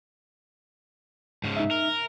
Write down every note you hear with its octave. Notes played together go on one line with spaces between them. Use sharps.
G#2 C#3
D#4 E5
A#4